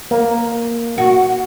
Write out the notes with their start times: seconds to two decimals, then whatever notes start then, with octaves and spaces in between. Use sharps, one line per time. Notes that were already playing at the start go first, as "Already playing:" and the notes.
0.11 A#3
0.98 F#4